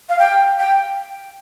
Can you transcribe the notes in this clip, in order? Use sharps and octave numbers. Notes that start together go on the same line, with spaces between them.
F5
G5
G5